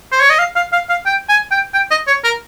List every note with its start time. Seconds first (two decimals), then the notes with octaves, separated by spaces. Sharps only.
0.12 C5
0.20 C#5
0.30 D#5
0.39 F5
0.56 F5
0.73 F5
0.89 F5
1.06 G5
1.29 G#5
1.51 G5
1.74 G5
1.91 D#5
2.07 C#5
2.24 A#4